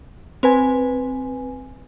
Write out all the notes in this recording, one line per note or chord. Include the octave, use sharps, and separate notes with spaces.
C4 B4 G#5